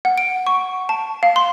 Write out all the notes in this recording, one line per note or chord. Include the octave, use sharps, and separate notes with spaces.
F#5
D7
C#6
A5
F5
C6